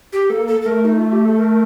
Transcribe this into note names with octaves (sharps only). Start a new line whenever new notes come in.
G4
A#3 A4
A4
A4
A3 A#4
D#4
F4
G4
A4
A#4